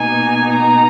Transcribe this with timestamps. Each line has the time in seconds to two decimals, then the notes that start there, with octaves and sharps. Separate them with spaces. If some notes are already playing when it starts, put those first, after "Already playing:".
Already playing: B2 A#3 D#4 G#5
0.55 A#5